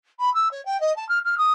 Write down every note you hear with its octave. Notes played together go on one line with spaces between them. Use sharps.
B5
E6
C#5
G5
D#5
A5
F6
F6
D#6